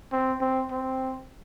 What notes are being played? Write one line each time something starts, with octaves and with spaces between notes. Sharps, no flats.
C4
C4
C4